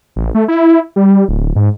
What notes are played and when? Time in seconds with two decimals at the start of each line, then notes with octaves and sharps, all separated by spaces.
0.16 A1
0.35 A3
0.48 E4
0.96 G3
1.28 D1
1.56 G#2